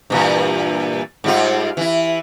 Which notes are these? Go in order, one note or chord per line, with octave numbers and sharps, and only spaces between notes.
G2 A#2 E3
G#2 G3 F4
E3 E4